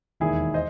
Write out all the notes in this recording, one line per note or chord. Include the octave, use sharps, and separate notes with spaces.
E1 D#2 D#3 E4 G#4
C5 D#5